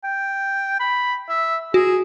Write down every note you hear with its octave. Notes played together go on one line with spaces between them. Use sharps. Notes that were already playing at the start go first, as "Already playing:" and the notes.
G5
B5
E5
F#4 G#4